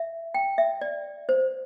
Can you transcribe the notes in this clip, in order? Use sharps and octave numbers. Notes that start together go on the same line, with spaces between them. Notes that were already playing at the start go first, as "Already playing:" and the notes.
Already playing: E5
G5
E5
D5
C5